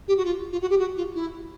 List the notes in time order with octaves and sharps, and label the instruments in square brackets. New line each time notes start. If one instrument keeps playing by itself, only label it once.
[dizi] G4
F#4
F4
F4
F#4
G4
F#4
F4
E4